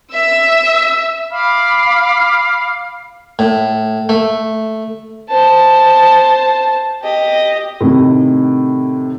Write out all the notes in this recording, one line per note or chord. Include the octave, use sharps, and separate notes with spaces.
E5 E6
F5 B5 D6 F6
A2
A3
C5 A5
G4 D#5
A2 C3 D#3